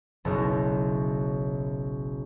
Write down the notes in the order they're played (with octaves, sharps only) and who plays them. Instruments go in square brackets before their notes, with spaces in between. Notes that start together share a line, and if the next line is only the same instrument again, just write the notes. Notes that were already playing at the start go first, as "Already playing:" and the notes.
[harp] F#1 B1 F#2